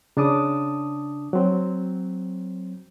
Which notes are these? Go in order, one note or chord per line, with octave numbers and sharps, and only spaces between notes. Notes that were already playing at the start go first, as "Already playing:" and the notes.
C#3 D4 A5 D6 D#6
F#3 C4